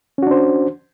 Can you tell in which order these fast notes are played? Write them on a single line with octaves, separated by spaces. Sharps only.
C#4 F#4 D4 C5